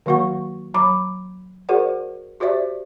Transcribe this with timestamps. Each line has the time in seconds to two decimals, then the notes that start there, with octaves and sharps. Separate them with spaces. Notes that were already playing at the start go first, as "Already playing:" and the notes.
0.06 D#3 F#3 A#3 F#4 F#5 C#6
0.74 F#3 A#5 B5 D6
1.69 F#4 G#4 A#4 C5 D5 F#5
2.40 F#4 G4 C5 D5 E5